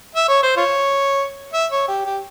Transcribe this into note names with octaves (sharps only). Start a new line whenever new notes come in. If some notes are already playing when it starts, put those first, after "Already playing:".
E5
C#5
C5
F4 C#5
E5
C#5
G4
G4